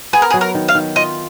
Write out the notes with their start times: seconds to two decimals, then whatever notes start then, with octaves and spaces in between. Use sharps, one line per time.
0.13 B3 G#4
0.22 A#4
0.30 G#4
0.34 F#3
0.41 A#4
0.54 D#3
0.68 F5
0.75 D#3
0.96 F4 D#5